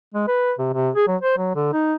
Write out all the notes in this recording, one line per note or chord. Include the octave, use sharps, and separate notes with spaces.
G#3
B4
C3
C3
G#4
F#3
C5
F#3
D3
D#4